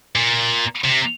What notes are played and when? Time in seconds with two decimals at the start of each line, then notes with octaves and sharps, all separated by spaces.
0.16 A#2
0.84 C3